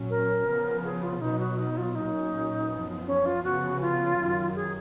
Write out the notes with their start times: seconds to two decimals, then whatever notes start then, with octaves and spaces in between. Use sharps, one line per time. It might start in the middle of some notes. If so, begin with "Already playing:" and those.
Already playing: A#2 F#3 C#4
0.10 A#4
0.47 C#3 F3 B3
0.84 G#4
1.03 F4
1.21 B2 F#3 B3 D#4
1.40 F#4
1.58 D#4
1.77 F4
1.95 A#2 F#3 A#3 C#4 D#4
2.70 F#2 F3 B3
3.07 C#4
3.26 F4
3.44 C#3 F3 B3 F#4
3.81 F4
4.18 F#2 D#3 F#3
4.56 G#4